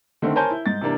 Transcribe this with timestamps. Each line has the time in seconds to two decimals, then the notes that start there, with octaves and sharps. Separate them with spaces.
0.22 D3 D#3 A3 C4
0.36 A#4 C5 C#5 G#5 A5 G6
0.51 E4
0.66 G#2 A6
0.81 C3 E3 A#3 D4